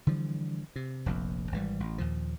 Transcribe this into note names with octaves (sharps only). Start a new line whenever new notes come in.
D3 E3 F3 G3
C3
F1 A#1 F2
G#1 E3 G3
A1
D#2 A#2 F3